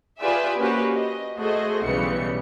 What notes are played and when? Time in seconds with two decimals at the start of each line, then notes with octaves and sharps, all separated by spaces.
0.21 F4 G4 G#4 B4 D5 E5
0.59 A#3 C#4 F#4 G4 B4 C5
0.94 D#5
1.38 A3 F#4 G#4 A4 C5 D#5
1.84 B1 C#3 E3 G3 C#7